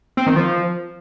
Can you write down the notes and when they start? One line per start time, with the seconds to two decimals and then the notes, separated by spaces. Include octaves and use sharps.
0.17 C4
0.27 D#3
0.36 F3